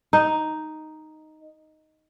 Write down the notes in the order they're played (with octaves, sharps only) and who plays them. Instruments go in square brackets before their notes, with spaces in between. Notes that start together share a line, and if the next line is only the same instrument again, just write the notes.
[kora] D#4